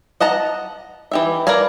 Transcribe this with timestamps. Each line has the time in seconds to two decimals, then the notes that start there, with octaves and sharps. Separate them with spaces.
0.20 D#5 F#5 A5 A#5
1.11 E3 G4 E5
1.47 A#4 B4 D5 F5 G#5